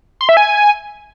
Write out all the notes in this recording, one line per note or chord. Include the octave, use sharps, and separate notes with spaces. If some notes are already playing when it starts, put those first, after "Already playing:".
C6
E5
G#5